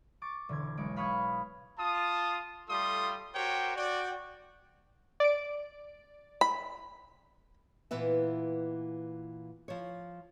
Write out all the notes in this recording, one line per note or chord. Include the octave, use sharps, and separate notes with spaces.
C#6 D6 A6
E1 D3 C5 G#6
B1 G#3 C#5 D7
F5 B5 C#6 D#6 F6 G#6
F4 A5 D#6
G3 A3 F4 A4 C6 D#6
F#4 G4 A#4 C5 C#5 G5
F#4 D5 G5
D5 D7
B5
A#2 E3 B3 B4 E5
F3 C#5